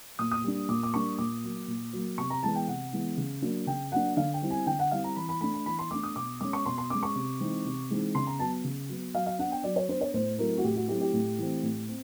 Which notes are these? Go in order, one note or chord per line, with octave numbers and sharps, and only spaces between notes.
A#2 D#6
D#6
G3 A#3 D4
A#2 D6
D6
G3 A#3 D4 C#6
A#2 D6
F#3 A#3
A#2
F#3 A#3
C3 C#6
A#5
E3 G#3 B3 A5
G5
C3 F#5
E3 G#3 B3
C#3
F#3 A#3 D4
C#3 G5
F#3 A#3 D4 F#5
D3 F5
G5
G3 C4 E4
G#5
D3 G5
F#5
G3 C4 E4 F5
A#5
E3 B5
B5
A3 D4 B5
B5
E3 B5
C6
A3 D4 D6
D#6
B2 D6
G#3 C#4 D6
C#6
B2 C6
C6
G#3 C#4 D6
C#6
C3
E3 G#3 C4 D#4
C3
E3 G#3 C4 D#4
C#3 C6
A#5
F#3 B3 A5
C#3
F#3 B3
F#3 F5
F5
B3 D4 F#5
G5
F#3 D5
C#5
B3 D4 C5
C#5
A2 C5
F#3 A3 C4 E4 A#4
F#4
A2 G4
F#4
F#3 A3 C4 E4 G4
G4
A2
E3 A3 C4
A2
C4